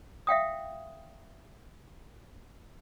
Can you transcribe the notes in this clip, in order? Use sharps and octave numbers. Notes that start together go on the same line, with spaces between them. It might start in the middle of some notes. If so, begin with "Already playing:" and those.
E5 F5 G5 D#6